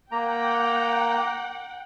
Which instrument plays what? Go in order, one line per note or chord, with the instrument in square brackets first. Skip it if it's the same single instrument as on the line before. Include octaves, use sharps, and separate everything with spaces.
[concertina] A#3 A#5 [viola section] F#5 G5